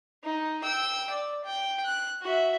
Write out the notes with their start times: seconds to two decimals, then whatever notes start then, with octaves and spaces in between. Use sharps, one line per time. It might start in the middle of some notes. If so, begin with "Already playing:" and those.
0.24 D#4
0.63 G5 E6
1.10 D5
1.44 G5
1.85 F#6
2.23 F#4 E5